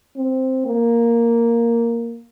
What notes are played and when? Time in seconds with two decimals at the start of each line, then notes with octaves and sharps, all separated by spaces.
0.17 C4
0.66 A#3